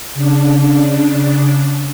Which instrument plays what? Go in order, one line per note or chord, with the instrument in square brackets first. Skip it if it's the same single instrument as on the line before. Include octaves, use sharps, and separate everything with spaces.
[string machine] C#3 D4